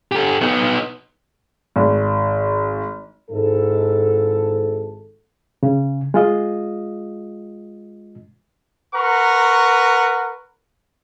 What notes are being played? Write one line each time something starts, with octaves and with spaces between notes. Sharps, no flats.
G4 A4
B3 D#4
G#1
G#1 G#2 E4 A4
C#3
G#3 F4 D#5
A#4 B4 F#5 A#5 C#6